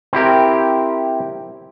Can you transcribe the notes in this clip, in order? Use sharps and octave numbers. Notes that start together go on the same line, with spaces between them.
C4 E4 G4 A#4